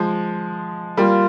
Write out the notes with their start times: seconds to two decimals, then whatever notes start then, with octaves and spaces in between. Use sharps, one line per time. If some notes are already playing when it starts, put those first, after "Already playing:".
Already playing: F3 G#3
0.97 G3 A#3 F4